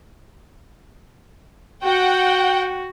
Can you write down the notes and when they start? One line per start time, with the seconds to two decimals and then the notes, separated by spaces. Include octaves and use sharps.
1.84 F#4 F#5 G5